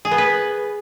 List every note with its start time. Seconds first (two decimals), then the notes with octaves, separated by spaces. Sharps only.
0.05 G#4
0.11 B3
0.18 B4